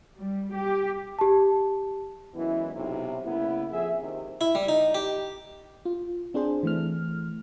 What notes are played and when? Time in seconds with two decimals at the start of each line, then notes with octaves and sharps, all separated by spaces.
0.17 G3
0.53 G4
1.19 G4 A5
2.35 F#2 E3 G#3 B3 E4
2.74 B1 C3
3.25 C#3 A#3 B3 E4
3.71 F2 G#4 E5
4.01 D#2 C3
4.41 E4
4.55 G3
4.69 D#4
4.95 G4
5.85 F4
6.34 C4 D4 G#4 C5
6.63 E3 A3 F6